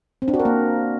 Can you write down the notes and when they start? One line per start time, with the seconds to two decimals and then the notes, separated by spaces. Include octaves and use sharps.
0.22 C4
0.28 D4
0.34 F#4
0.39 A#4
0.45 A#3